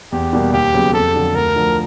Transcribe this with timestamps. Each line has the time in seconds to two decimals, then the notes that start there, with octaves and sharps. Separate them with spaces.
0.12 E2 G4
0.33 B2 G3 A#3
0.53 D#2 G4
0.74 C#3 F#3 B3
0.93 F2 A4
1.14 D3 F#3
1.35 D2 A#4
1.55 D3 F3 A3